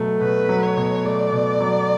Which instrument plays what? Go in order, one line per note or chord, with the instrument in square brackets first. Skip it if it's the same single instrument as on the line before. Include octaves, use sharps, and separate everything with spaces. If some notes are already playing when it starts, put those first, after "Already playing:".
Already playing: [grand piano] B2 F#3 A3
[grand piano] B2 [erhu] B4
[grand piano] F#3
[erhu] C#5
[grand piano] B2
[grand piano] A3 [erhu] D5
[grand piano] B2
F#3